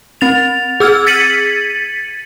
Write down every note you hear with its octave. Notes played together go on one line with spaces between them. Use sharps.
C4 A6 F7
G#4 E6 F6 G#6
G#6 A6 B6 C#7 D#7 F#7